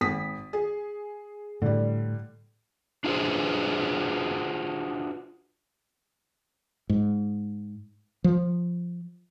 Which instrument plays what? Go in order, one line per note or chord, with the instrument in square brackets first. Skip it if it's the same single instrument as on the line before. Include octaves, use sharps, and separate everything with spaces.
[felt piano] G#1 D#6 B6
G#4
[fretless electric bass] A2 [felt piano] D3 G3
[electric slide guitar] D4 F4 F#4 G#4 B4 C5
[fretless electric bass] G#2
F3